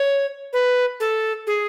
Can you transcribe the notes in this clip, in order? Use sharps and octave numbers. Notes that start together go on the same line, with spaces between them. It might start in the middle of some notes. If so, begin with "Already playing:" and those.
Already playing: C#5
B4
A4
G#4